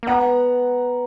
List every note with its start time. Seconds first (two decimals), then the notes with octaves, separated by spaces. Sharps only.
0.03 A#3
0.07 B3 F#5 A#5